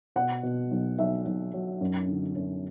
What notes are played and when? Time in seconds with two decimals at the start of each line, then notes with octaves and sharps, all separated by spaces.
0.16 B2 F#5
0.43 B2
0.71 B1
0.98 B1 E5
1.26 B1
1.54 F#3
1.81 F#2
2.08 D3
2.35 F#2